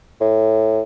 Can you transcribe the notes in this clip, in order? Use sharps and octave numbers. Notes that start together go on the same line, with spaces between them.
A2